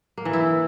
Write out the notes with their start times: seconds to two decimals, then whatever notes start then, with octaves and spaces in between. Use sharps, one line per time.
0.18 A#3
0.25 E3
0.33 E4